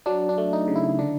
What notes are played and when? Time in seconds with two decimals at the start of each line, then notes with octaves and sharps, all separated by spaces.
0.06 F#3 D4
0.29 D4
0.38 A3
0.53 D#4
0.68 C#3
0.76 E4
0.99 D3 D4